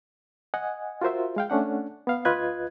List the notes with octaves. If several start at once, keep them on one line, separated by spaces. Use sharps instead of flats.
D#5 F#5 G#5
F4 F#4 A#4 C5 E5
G#3 F5 G5
A3 C#4 D4 F#5
B3 F5
D2 F4 B4 D#5 F#6 G#6